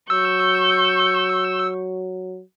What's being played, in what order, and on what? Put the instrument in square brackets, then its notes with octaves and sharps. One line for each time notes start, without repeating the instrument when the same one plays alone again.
[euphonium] F#3 [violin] C#6 G6 [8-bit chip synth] E6